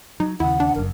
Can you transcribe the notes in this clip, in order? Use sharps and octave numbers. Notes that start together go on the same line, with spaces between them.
F#3 D#4
D#2 C#3 E4 F#5
D4
F#1 F#2 A#4